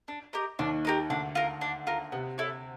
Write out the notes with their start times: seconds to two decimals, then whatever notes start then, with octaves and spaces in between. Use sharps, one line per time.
0.08 D4
0.33 G4 A#4 D#5
0.59 D#2 D#3 D4
0.85 G4 A#4 D#5
1.10 D2 D3 D4
1.35 F4 A#4
1.61 D4
1.87 F4 A#4
2.12 C3 B3
2.38 E4 A4 C#5